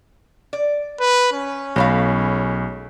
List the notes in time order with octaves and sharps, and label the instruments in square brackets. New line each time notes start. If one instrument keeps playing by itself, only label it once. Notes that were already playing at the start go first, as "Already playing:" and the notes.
[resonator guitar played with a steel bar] D5
[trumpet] B4
C#4
[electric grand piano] B1 C#5 B5 [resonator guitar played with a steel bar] G#3 A3 F5